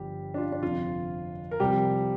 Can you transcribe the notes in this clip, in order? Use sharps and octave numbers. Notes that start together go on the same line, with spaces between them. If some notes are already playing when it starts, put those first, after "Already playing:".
Already playing: G1 G2 F3 G3 G4
D4
F4
D4
G1 F2 C3 F3 F4
A#4
C2 C3 F3 G3 G4